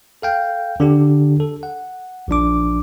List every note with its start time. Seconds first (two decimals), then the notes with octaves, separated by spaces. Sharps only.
0.22 A4 F5 G5
0.80 D3 D4 G4
1.40 A4
1.63 F#5
2.28 A#1 F3 D4 D6